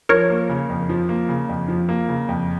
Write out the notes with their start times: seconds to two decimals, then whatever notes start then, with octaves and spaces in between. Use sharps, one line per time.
0.09 F3 A#4 C#5
0.30 A#3
0.49 C#3
0.69 F2
0.89 F3
1.09 A#3
1.29 C#3
1.49 F2
1.68 F3
1.89 A#3
2.08 C#3
2.29 F2